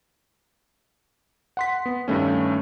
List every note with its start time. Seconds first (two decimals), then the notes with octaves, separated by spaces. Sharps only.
1.57 F#5 C6 B6
1.86 B3
2.08 G2 D#3 A3 C#4